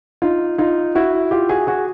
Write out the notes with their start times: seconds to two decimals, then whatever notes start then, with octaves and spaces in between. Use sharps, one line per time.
0.22 D#4 F4
0.58 D#4 F4
0.95 E4 F#4
1.31 F4 G4
1.49 F#4 G#4
1.67 F#4 G#4